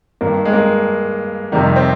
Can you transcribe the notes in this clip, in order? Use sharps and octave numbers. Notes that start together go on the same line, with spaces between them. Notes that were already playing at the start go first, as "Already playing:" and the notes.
G2 D#3 A#3
G#3
A#3
F2 C3 D#3 G3
C4